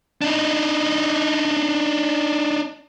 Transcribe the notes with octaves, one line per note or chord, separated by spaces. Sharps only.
D4 D#4